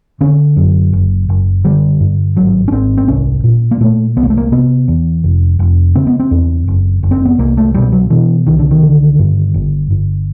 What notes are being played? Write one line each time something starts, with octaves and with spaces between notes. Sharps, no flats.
D3 C#4
F#2
F#1
F#1
D3 G3
G2
G#1 F#3
C#4
G#1 C4
C4
C2 C#4
A#2
A#3
A#2 A3
C2 B3
A#3
A3
A#3
C3 B3
E2
F1
F1
C#3 C4
B3
C4
E2
F#1
F#1
C4
B3
C2 A#3
A3
B2 G3
F#3
B2 E3
C2 D#3
D3
D#3
D3
G2
G1
G1